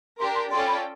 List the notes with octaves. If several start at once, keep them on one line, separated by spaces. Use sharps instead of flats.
D4 G4 A#4 C6
C6
C#4 F4 A4 D5 G5 C6
B5